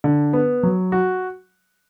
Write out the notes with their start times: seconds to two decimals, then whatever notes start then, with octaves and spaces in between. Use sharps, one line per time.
0.04 D3
0.33 B3
0.63 F#3
0.92 F#4